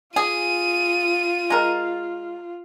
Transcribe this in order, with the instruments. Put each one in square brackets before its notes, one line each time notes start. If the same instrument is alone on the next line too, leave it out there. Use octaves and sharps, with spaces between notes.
[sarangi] F4 [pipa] G#4 [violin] D#7
[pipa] G#3 A#4